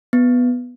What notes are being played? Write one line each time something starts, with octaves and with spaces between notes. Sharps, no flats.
B3